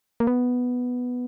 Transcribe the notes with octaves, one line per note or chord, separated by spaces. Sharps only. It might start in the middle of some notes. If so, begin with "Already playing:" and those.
A#3
B3